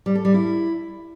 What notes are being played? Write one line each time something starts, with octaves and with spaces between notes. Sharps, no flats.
G3
A4
G3
E4